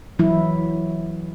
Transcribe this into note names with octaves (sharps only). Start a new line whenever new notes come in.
E3 F#3 E4